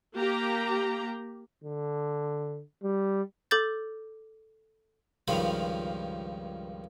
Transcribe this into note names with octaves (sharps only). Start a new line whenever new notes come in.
A#3 G4 A#5
D3
G3
A4 D6 G6 A6
C#2 G2 D#3 F3 F5 B5